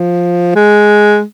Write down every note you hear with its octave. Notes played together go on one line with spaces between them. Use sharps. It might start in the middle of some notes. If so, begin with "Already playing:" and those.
Already playing: F3
G#3